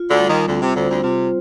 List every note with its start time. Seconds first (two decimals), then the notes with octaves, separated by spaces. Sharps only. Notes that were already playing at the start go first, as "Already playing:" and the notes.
Already playing: F4
0.10 D2 D3
0.19 G3
0.29 D#2 D#3
0.48 D2 D3 C4
0.62 C3
0.76 D2 D3 C5
0.90 D2 D3
1.04 C3 F4